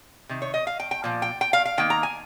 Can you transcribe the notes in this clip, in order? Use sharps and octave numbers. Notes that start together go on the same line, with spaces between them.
C3 D#3
C#5
D#5
F5
G5
G5
A#2 F3
G5
G5
F5
F5
D#3 A#3 G5
A#5
G#5